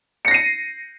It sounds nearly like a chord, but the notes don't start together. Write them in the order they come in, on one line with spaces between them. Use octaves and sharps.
C#7 A#6 C7 D#7